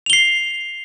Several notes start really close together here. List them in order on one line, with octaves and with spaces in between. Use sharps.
F7 G7 C7